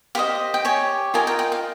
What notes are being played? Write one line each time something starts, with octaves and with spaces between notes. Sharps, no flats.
G4 C5 D#5 F5
G5
G4 C#5 G#5
F4 A#4 D#5 G#5
G5
G5
F5